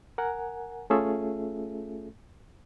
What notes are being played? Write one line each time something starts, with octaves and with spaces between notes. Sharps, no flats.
A#4 F#5 G#5
A3 C#4 F4 G#4 A4 E5